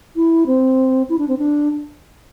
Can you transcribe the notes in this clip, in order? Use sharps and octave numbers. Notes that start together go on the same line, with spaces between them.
E4
C4
E4
D4
C4
D4